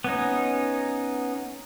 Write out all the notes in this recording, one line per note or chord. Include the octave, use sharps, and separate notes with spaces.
B3 C#4 D#4